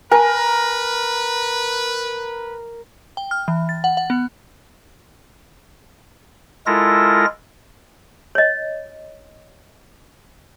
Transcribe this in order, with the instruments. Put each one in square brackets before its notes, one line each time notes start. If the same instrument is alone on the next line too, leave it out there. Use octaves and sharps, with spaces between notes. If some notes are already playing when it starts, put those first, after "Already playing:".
[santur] A#4 [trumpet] B4 [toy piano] G#5 A5
[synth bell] G5
F6
E3
A6
F#5
F#5
B3
[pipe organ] G#3 E4 F4 A4 A#4 A#6
[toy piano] C#5 D#5